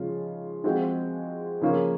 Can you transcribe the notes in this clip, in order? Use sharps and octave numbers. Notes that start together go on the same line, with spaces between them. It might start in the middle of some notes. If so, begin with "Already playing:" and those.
Already playing: C#3 F3 G#3 C#4 F4
F3 G#3 C4 F#4
C#3 F3 A#3 C#4